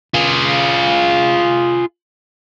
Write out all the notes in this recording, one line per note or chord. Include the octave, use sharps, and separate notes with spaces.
F4 G#4